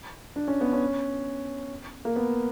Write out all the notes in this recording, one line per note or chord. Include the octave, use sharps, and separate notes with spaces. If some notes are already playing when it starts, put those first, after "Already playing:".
D4
C#4
B3
C#4
A#3
B3